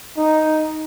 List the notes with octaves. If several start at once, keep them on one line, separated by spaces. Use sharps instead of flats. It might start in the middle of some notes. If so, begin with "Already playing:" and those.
D#4